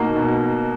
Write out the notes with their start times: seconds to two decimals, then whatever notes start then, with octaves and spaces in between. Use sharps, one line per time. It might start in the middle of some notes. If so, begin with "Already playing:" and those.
Already playing: B2 A#3 D#4 F#4
0.16 B2